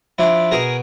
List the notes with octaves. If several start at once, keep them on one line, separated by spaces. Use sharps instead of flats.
F3 D4 E4
B2 G#4 A#4